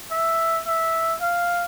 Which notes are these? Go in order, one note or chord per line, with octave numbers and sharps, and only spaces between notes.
E5
E5
F5